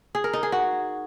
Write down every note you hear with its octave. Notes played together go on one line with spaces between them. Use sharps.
G#4
A#4
D#4
G#4
F#4